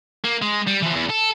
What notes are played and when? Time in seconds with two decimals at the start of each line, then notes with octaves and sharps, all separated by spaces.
0.24 A#3
0.42 G#3
0.67 G3
0.82 E3 F3
0.93 E2
1.09 A4